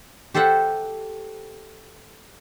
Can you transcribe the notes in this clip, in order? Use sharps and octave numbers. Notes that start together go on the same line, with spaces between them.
G4 A4 C5 E5 F#5